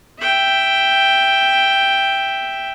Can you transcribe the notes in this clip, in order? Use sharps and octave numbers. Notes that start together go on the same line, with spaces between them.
E5 G5